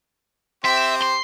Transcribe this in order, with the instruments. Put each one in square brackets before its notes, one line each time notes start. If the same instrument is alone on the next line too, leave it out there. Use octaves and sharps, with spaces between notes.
[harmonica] C4 G4 C5 [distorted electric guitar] E5
[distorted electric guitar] C6